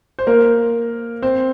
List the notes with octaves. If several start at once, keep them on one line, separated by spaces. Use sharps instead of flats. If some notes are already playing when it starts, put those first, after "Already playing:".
C5
A#3 A#4
C4 C5